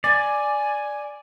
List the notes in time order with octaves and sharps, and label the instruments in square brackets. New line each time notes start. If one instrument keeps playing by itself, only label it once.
[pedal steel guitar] D5 [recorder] G#5